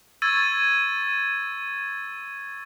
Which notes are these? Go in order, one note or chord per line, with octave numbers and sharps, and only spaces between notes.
C#6 E6 G#6 A6 D#7